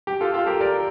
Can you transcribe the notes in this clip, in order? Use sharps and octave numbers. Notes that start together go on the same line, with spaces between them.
G4
F4 A4
F4 A4
G4 A#4
A#4 D5